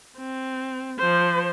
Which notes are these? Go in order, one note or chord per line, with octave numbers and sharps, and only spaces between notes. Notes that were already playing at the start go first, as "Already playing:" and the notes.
C4
F3 C5